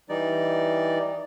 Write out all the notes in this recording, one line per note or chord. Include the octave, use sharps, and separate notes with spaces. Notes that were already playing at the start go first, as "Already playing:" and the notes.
E3 G3 D#4 D5